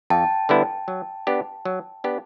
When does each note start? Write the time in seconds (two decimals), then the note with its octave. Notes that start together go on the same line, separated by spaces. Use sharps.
0.10 F2 G5 A5
0.49 D3 G3 B3 E4
0.88 F#3
1.27 B3 D4 G4
1.65 F#3
2.04 B3 D4 G4